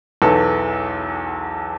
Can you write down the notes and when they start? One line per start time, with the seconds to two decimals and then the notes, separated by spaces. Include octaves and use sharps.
0.22 B1 E2 E3 A4